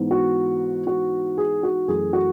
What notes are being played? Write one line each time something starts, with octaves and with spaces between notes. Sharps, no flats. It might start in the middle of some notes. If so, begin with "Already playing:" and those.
Already playing: G#2 E3 G#3 B3
F#4
F#4
G#4
F#4
F#2 E3 A3 G#4
F#4